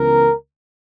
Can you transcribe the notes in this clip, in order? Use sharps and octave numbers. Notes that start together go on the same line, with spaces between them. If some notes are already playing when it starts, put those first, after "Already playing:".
Already playing: C#2 C#3 E3 B3 A#4